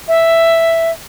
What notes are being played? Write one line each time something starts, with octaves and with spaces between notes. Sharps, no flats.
E5